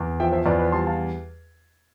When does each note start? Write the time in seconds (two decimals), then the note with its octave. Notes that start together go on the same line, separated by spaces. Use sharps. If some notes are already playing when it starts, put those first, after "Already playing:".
Already playing: E2
0.20 F3 E5 G5
0.32 C5 E5
0.46 E2 B4 D5
0.59 B4 D5
0.72 G3 A5 C6
0.87 F5 A5